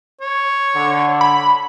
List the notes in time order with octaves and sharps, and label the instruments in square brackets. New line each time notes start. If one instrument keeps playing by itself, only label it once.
[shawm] C#5
[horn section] D3
[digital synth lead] B5